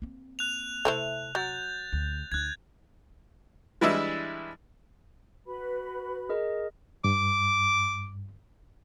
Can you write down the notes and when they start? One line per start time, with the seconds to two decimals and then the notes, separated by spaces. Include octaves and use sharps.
0.02 A#3 C4
0.39 F#6 F7
0.85 C3 A3 E4 C5
1.35 F#3 G6 A6
1.93 D2
2.32 D2 D#4 F#6 G#6
3.81 E3 G3 G#3 D4 E4
5.46 F#4 B4 B5
6.29 G#4 A#4 D#5
7.04 G2 D6